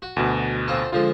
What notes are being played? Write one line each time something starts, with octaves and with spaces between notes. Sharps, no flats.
F#4
D2 B2
C4 F4 A4
D3 F3 G#3 F4